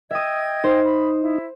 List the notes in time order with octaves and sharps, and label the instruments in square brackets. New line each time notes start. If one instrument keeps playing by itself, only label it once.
[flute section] D#5 G5 G#6 [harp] E5 D#6
[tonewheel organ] D#4 [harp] C5
[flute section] B5
E4